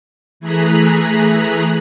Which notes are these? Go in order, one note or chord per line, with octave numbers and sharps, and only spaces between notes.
E3 A3 G#4 A#5 F#6 B6